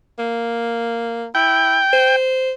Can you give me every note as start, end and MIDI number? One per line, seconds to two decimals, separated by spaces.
0.19 1.27 58
1.35 1.79 64
1.35 2.16 79
1.93 2.53 72